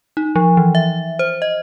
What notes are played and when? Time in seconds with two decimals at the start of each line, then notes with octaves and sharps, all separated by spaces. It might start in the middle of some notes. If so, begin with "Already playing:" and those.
0.17 D#4
0.36 F3
0.57 E3
0.75 E5
1.19 C5
1.42 D#5